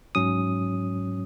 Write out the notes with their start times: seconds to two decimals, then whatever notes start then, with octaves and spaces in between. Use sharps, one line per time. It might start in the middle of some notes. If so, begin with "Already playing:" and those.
0.15 G#2 F#3 C#4 D#6